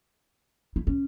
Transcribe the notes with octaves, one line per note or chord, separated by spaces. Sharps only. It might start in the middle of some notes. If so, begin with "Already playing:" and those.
E4
C#4